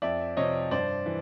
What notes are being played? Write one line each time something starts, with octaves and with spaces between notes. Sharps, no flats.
F2 D5 E5
C3 F3 C#5 D#5
G2 C5 D5
E3